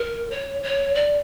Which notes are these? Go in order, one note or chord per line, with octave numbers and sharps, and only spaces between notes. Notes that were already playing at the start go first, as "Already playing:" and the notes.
Already playing: A#4
C#5
C#5
D5